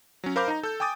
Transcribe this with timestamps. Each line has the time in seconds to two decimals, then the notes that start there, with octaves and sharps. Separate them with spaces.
0.24 F#3 C#4
0.36 A#4 C5 F5 B5 D6 G6
0.48 D#4 A#5
0.63 A4 G6
0.80 G5 G#5 D6 D#6 A6